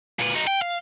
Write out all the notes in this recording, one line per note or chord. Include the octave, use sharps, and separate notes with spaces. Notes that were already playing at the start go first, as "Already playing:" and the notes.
A#2 B4
D#4 F#4
G5
F5